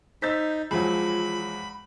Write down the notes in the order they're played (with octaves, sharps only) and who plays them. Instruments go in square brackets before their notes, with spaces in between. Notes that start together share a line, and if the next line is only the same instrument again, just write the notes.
[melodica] D#4 [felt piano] C5 A6 [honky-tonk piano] E6 G6 B6
[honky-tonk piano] E2 F#3 [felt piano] F3 G#3 [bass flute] F4 [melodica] B5